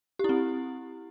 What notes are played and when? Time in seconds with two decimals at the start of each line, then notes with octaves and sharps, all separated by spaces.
0.19 G4
0.24 E4
0.29 C4